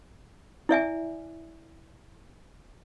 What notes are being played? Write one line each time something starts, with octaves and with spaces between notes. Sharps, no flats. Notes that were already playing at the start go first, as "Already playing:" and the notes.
E4 D5 E5 G#5